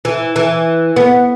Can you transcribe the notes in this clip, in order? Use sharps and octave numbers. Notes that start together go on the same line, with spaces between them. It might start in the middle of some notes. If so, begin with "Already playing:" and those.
E3
E3
B3